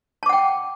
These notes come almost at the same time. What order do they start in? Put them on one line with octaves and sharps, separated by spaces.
A5 D6 F#5 G5